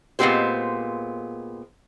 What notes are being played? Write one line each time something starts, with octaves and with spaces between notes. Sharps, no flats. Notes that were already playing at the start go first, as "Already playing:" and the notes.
A#2 G#3 B3 C4 G4 C5